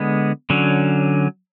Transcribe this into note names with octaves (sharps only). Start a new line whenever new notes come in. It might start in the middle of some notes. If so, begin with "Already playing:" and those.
Already playing: D3 G#3 B3
D3 F#3 C#4